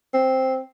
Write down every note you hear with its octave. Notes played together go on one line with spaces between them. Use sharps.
C4